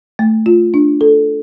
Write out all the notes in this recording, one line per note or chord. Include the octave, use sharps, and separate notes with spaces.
A3
F4
D4
A4